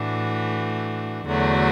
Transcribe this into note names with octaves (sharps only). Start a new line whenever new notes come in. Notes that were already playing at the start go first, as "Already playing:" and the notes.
Already playing: A2 E3 A3 D4 F#4
E2 D3 F#3 A3 F#4